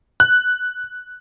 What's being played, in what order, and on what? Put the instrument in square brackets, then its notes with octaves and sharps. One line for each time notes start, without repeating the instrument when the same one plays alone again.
[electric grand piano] F#6